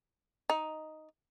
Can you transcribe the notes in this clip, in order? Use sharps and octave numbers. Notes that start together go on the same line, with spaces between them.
D#4